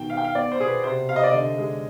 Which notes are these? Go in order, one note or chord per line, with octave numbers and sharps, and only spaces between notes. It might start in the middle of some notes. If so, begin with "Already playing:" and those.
Already playing: B2 D#3 G5
B3 F5
G5
F5
B3 D5
C5
B2 G#4
B4
C3 C5
C3 F5
D#5
D5
D3 D#5
G#3